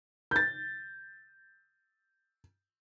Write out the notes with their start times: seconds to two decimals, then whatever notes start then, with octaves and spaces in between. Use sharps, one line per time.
0.31 G6 A6